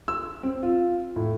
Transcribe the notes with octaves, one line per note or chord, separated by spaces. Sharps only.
E6
C4
F4
A2